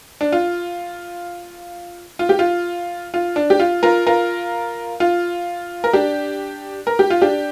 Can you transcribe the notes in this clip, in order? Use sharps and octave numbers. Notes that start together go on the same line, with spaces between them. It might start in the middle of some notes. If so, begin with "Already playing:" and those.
D4
F4
F4
G4
F4
F4
D4
G4
F4
F4 A#4
F4 A#4
F4
A#4
D4 G4
A#4
G4
F4
D4 G4